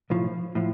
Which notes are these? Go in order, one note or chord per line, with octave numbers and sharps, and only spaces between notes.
B1 A2 F3
A2 F3